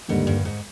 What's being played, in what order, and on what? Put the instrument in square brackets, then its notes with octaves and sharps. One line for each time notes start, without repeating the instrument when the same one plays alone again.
[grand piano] D#2 D3 G3 [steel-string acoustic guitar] G#2
[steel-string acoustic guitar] G2
G#2